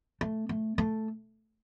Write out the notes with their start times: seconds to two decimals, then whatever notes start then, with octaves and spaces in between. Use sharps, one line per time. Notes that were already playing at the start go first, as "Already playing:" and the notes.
0.21 A3
0.49 A3
0.78 A3